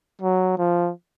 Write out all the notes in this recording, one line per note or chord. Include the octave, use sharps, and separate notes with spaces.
F#3
F3